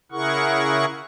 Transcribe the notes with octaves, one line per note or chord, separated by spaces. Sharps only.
C#3 E4 G#4 A#4 F#5 C#6